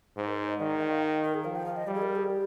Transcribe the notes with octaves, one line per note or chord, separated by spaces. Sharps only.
G#2 C5
A#4
C5
D#5
D#3 D5
D#5
G5
F5
D#5
A#4
G#4
F3 F5
G5
F5
D#5
G3 D5
G#4
A#4
G#4
G4